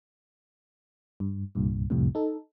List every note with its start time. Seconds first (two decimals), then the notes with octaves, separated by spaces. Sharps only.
1.20 G2
1.55 C2 G2 A#2
1.90 C2 F2 A2 C3
2.15 D#4 A4